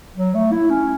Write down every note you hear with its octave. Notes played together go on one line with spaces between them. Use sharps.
F#3
A3
E4
C#4